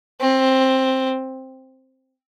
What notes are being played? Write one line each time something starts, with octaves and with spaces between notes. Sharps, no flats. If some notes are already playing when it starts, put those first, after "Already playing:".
C4